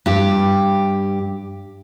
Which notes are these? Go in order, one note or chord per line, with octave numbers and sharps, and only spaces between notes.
G2 G4